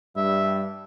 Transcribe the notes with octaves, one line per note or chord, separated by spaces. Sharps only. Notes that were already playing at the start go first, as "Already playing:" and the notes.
G2 G3 E5